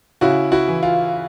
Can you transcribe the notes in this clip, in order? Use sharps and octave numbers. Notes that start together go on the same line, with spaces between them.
C#3 E4 F#4
E4 F#4
E3
F4